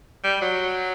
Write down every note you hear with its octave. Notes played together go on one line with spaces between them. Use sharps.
G3
F#3